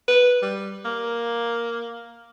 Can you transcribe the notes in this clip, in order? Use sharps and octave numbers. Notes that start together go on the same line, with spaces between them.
B4
G3
A#3